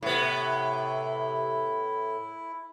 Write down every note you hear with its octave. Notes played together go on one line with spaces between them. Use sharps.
A2 C3 B3 E4